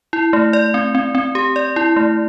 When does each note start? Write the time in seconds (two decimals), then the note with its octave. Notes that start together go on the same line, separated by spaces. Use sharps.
0.13 E4
0.33 A3
0.53 D5
0.74 C4
0.95 C4
1.15 C4
1.35 G4
1.56 D5
1.76 E4
1.96 A3